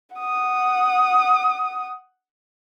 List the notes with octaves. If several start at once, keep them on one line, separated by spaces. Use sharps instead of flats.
F#5 D#6